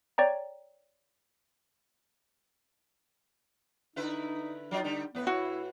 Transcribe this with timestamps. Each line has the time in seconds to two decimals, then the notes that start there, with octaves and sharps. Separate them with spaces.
0.18 C#5 D5 G5 A#5
3.96 D3 D#4 E4 B4
4.71 F#3 D#4 F4 D#5
4.84 D3 G3
5.15 A2 B3 B4
5.27 E4 F#4